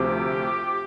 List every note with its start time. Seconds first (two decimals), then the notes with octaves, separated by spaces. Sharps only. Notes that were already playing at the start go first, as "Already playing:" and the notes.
Already playing: D2 C3 F3 C4 G4